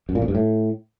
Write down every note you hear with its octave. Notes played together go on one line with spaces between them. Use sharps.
F#2
A#2
F2
G2
A2